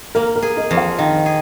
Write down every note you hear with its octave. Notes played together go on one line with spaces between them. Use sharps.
A#3 A#4
A#4
G#4
A#4 D#5
F2
C5 F5
D#3
G#4